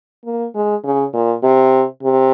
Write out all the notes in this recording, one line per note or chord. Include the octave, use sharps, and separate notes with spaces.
A#3
G#3
C#3
A#2
C3
C3